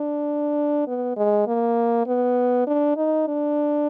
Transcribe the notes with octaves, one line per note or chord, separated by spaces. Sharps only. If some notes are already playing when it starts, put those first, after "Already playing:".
Already playing: D4
B3
G#3
A#3
B3
D4
D#4
D4